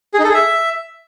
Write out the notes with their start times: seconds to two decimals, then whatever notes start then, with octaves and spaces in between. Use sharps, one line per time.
0.14 G#4
0.19 D#4
0.24 A4
0.29 G#4
0.34 E5